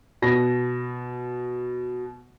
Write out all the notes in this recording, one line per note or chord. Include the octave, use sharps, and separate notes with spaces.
B2 A#6